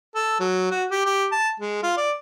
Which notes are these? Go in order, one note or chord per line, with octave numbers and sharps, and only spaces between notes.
A4
F#3
F#4
G4
G4
A5
G#3
F4
D5